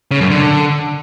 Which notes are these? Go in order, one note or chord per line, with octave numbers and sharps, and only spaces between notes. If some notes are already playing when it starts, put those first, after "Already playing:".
C#3
F#2
D3